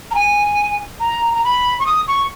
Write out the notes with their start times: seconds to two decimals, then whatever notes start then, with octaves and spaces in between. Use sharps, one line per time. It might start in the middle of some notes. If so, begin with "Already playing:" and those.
0.11 A#5
0.15 G#5
1.00 A#5
1.35 A#5
1.44 B5
1.80 C#6
1.86 D#6
2.08 C#6